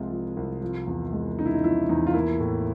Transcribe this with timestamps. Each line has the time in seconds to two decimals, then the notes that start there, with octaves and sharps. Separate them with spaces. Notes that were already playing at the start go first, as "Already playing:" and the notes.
Already playing: C2 C3 F3 G#3 F4
0.11 F3
0.37 C2
0.62 F3
0.87 E2
1.13 G#3
1.38 C#3 D#4
1.46 E4
1.54 D#4
1.63 F3 E4
1.89 E2 D#4
2.07 F4
2.14 A#3 E4
2.40 A2